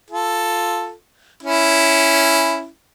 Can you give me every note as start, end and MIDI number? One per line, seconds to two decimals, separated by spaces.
0.11 0.92 65
0.11 0.92 69
1.43 2.67 61
1.43 2.67 64